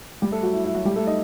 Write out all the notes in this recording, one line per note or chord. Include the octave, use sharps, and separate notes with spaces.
G3 G4
A3 A4
F#3 F#4
E4
E4
F#3 F#4
G3 G4
A3 A4
D#4 D#5